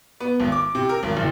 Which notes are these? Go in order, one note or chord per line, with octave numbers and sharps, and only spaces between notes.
B3
G#1
D6
C3
A#4
G#1
F#1